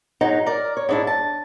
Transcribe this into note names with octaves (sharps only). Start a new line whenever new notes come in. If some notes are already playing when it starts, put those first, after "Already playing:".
G#2 F#3 D#4
A#4 D5
C#5
G#2 D4 E4
A5